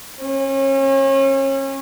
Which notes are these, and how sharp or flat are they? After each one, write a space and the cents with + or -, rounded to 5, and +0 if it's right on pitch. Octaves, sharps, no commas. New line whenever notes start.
C#4 -35